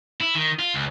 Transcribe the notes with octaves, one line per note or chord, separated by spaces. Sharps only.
E4
D#3
F4
C#2